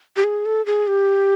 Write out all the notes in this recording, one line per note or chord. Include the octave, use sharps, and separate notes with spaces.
G4
G#4
A4
G#4
G4